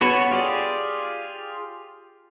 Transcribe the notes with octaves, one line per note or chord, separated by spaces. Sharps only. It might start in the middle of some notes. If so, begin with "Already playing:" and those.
B3 F#4 A4 B4 C#5
F4 G4 G#4 D5